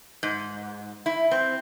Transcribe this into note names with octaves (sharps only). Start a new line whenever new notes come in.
G#2
E4
C4